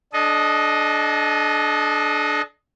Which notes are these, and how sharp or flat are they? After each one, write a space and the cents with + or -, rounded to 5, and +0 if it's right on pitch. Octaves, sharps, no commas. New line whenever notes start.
D4 +0 A4 -40 D#5 +0